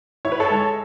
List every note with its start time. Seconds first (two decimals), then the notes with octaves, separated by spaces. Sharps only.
0.25 E4 C#5
0.32 B4
0.40 A4 C#5
0.50 G#3